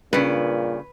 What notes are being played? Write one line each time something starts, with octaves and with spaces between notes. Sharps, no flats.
G2 A#2 C#3 B4